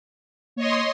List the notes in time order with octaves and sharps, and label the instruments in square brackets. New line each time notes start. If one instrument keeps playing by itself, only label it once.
[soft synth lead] A#3 [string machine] C#5 D#5 C6